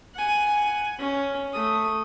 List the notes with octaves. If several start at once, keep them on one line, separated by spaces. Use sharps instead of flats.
F#5 G#5
C#4
A3 D#6